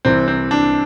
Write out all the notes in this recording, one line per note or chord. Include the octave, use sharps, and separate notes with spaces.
C2 C3 E3 C4
C4
D4